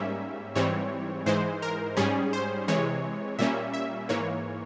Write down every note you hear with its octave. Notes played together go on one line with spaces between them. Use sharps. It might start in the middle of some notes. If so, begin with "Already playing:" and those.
Already playing: G#2 G3 A#3 C#4 E5
G#2 E3 G3 C4 C#5
G#2 E3 G#3 C5
A#4
G#2 G3 C#4 G#4
C5
C3 E3 G#3 C#5
A#2 G3 A#3 C#4 E5
E5
G#2 E3 A#3 C#5